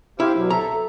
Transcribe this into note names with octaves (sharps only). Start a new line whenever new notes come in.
E4 G4 C5 F5
B2 F#3
A4 E5 A#5